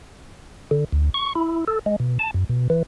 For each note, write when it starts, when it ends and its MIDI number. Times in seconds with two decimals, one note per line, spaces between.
0.71 0.85 50
0.92 1.10 38
1.14 1.33 85
1.35 1.65 64
1.68 1.79 69
1.86 1.96 56
2.00 2.18 47
2.19 2.31 81
2.34 2.44 42
2.49 2.68 47
2.70 2.83 52